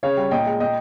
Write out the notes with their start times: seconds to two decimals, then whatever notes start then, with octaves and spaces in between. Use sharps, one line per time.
0.03 C#3 C#5 F5
0.17 G3
0.31 A#2 D#5 G5
0.46 G#3
0.60 A#2 D#5 G5